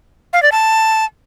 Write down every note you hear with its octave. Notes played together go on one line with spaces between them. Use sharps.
F5
D5
A5